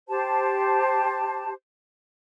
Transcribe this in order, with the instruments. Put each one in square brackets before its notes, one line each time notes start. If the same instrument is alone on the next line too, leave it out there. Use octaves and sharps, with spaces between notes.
[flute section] G4 C5 A5